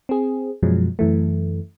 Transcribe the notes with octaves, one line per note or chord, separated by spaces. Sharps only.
C4 G#4
F#2 B2 F3 F#3 G#3
F#2 E3 A3